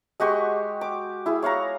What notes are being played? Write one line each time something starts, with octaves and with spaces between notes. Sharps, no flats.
G#3 F#4 G4 C#6
D6
E4 G#4
C#5 F5 F#5 A#5